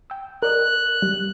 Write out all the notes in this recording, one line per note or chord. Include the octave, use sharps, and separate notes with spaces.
G5 E6
A#4 D5 D#5 F#6
G3